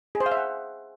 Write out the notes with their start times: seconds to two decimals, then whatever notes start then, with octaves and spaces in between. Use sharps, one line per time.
0.15 G#4
0.20 C5
0.26 F5
0.32 E5
0.37 F#5